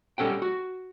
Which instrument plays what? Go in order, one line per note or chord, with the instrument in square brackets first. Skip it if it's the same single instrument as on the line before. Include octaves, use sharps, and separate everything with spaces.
[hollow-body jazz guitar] G3 C#4 A4 F#5 G5
F#4